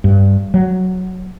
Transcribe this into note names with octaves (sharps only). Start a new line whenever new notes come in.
G2
F#3